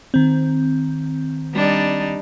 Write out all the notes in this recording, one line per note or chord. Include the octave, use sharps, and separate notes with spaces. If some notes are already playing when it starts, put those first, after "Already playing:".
D#3 C4
G3 D4 D#4